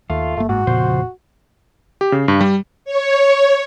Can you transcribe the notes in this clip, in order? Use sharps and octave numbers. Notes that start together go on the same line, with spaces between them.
D#2 A3 F4
G1 A3 A#3
G#2 F#4
F1 A#2 C#3 F3 B3 C5
G4
C#3
G2
G3
C#5